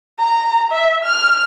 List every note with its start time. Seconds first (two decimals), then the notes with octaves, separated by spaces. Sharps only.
0.19 A#5
0.72 E5
1.04 F6